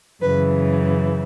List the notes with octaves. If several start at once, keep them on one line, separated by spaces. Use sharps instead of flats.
F#2 C#3 E3 B4